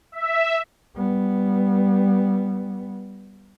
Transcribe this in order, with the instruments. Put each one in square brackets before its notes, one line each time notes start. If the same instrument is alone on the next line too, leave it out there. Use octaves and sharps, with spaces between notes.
[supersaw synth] E5
[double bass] G3 B3